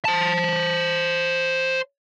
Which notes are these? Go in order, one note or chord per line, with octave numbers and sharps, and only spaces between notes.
C5 A5